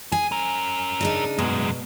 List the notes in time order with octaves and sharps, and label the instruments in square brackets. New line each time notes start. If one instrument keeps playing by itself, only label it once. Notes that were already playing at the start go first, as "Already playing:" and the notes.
[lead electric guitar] G#4 [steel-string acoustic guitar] G#5
[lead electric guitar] C#4 A#4
[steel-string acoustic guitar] C#3 D4 D#4
[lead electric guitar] F#2 G#3 [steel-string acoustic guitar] B2